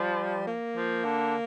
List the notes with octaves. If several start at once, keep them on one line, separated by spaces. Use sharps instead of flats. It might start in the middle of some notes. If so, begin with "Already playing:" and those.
Already playing: F3 G3
A#3
F3
D3